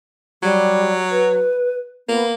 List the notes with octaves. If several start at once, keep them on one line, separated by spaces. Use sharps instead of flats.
F#3 G3
B4
A#3 B3